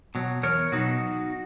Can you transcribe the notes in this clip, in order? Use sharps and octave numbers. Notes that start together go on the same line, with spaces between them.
B2 F#3
E2 A#4 C#5
B2 F#3 D#4 F#4